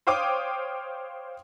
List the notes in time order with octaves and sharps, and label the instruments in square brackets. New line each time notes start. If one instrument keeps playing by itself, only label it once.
[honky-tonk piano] C5 C#5 F5 G5 D6 D#6